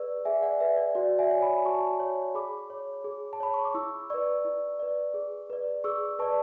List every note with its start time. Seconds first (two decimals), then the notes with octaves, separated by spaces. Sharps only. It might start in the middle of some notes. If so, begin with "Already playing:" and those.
Already playing: G#4 B4 D5 C#6 E6
0.25 G#4 E5 G#5
0.42 D5 F#5
0.60 B4 D5 E5
0.77 D5
0.95 F#4 D5 F#5
1.19 E5 G#5
1.30 C#5
1.42 G#5 B5
1.65 F#4 A5 C#6
2.00 C#5
2.35 G#4 B5 D6
2.70 C#5
3.04 G#4
3.33 A5
3.40 C#5 B5
3.54 C#6
3.65 D6
3.74 E4 C#6 E6
4.10 B4 D5 C#6 E6
4.45 E4
4.80 B4 D5
5.14 G#4
5.50 B4 D5
5.84 G#4 C#6 E6
6.19 B4 D5 A5 C#6